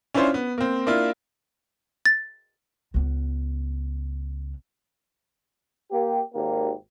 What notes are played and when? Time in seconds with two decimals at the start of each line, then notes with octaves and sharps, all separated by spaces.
0.14 C#4 D4 E4 F4 C5 C#5
0.34 B3
0.58 A#3 C4
0.87 A#3 D4 E4 F4
2.06 A6
2.94 C#2 B3
5.90 A#3 G4
6.33 G#1 D#2 A#3 G4